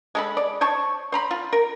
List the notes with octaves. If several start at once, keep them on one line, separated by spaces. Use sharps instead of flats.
G#3 A4 B5
D5
C5 C#5 A5 C#6
C5 A#5 B5
F4
A#4